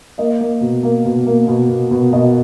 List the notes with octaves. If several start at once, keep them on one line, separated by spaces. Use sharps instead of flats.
A#3 D#5
A#3
B2
A#3
B2
A#3
B2
B2
B2
B2 D#5